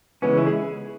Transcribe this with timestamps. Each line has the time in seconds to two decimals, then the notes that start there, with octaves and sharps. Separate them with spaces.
0.22 C#3 E3 G#3 B3 C#4
0.37 E4
0.47 G#4